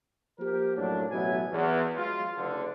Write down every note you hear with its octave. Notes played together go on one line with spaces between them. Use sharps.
F3 A#3 G4 A#4
F#2 A2 F#3 A#3 D4
A1 B2 F#3 B3 E4 G#5
E2
F#3 G#3 F4
F#1 D3